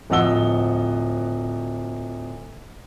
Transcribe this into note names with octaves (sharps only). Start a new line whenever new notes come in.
D1 F3 D#5 F#5 E6 G7